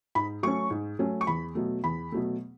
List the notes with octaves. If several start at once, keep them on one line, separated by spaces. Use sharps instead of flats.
G#2 B5
F#3 A3 C#4 C#6
G#2
F#3 A3 C#4
C#6
E2 B5
B2 F#3 A3
E2 B5
B2 F#3 A3